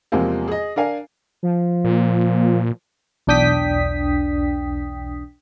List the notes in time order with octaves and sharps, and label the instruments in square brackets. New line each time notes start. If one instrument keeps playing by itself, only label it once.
[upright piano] E2 C3 F3 G#3 A#3 C4
G#4 D#5
D4 A#4 F5 G#5
[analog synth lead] F3
[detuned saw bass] A#2
[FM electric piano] B1 E2 D4 G5 D#6 B6